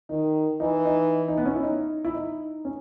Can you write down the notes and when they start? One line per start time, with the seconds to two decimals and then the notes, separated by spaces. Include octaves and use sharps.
0.09 D#3 D#4
0.60 E3 D#4
0.85 D#4
1.28 D#4
1.37 B3
1.45 C#4
1.55 E4
1.63 D#4
2.05 E4
2.14 D#4
2.65 C#4